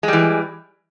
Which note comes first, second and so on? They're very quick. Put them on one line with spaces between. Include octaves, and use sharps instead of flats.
G#3 G3 E3